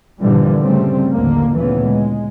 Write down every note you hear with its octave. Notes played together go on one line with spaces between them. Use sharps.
G2 A#2 D3 E3 F3 G3
C#3 G3 A3 C4
A1 D#2 D3 A#3
D2 A#2 C#3 E3 F3 B3
G#3